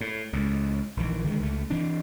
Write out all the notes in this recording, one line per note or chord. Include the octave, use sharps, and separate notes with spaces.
A2
C#2 A2
A#1 D#3 E3
D3 D#3 G#3
C#2 A3
E3 C4 D4